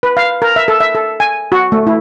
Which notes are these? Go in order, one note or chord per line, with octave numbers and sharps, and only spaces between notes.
B4
F5
A#4
E5
A4
E5
A4
G#5
F#4
A3
E4